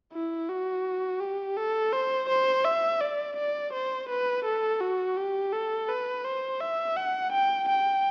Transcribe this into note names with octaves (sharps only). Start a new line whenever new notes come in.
E4
F#4
G4
A4
C5
C5
E5
D5
D5
C5
B4
A4
F#4
G4
A4
B4
C5
E5
F#5
G5
G5